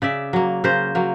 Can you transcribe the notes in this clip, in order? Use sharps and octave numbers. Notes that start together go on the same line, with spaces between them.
C#3 D5 E5
F#3 A#3
C#3 A#4 C5
F#3 A#3